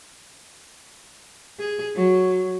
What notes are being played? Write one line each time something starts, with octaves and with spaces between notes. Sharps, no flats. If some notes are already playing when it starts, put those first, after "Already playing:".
G#4
F#3